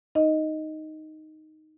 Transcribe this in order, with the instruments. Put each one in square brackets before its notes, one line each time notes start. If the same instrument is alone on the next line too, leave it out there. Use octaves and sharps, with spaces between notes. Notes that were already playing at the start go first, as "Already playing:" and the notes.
[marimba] D#4 D#5